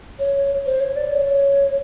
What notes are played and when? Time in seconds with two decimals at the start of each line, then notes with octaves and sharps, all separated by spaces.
0.19 C#5
0.66 C5
0.80 C#5
0.96 D5
1.11 C#5